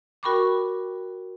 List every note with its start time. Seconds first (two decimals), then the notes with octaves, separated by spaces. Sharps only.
0.23 F#4 A#4 G5 B5 C#6 D6